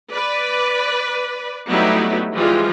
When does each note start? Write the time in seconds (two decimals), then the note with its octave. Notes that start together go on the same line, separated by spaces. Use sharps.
0.11 B4 D5
1.69 F#3 G3 A3 B3 D#4 E4
2.34 E3 F3 G3 G#3 F4